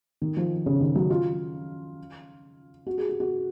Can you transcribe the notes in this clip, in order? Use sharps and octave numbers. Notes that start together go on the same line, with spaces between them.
D#3
F3
C#3
D#3
F#3
F4
F#4
G#4
G#4
F#4